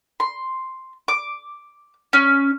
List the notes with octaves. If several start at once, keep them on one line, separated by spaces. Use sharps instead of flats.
C6
D6
C#4